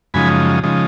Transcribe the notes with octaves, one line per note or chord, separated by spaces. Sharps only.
F#2 C#3 F3 G#3 D#4 G#5 B5
C#3 F3 G#3 D#4